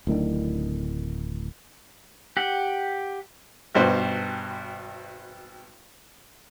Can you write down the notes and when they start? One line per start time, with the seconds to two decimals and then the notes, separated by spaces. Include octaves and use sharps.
0.07 D1 A2 D#3 D4
2.37 G4 F#5
3.75 G#1 G2 B2 C5